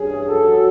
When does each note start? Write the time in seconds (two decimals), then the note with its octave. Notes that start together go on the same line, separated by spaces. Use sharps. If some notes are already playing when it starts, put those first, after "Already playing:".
Already playing: G2 C#4 G#4
0.10 E3
0.28 F#3 A4
0.46 F#3